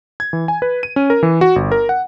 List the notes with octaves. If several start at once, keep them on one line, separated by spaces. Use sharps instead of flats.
G#6
E3
G#5
B4
D#7
C#4
A#4
E3
F#4
G1
A#4
F#5